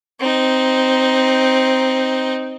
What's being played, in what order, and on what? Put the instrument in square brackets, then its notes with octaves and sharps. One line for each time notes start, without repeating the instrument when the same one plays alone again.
[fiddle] C4 D#4